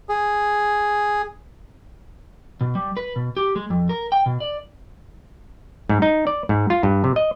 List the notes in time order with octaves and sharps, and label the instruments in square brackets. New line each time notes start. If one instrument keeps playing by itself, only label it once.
[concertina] G#4
[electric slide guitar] B2
G3
B4
B2
G4
G#3
F2
A#4
G5
B2
D5
[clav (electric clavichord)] G#2
D#4
D5
G#2
F4
G2
C3
D#5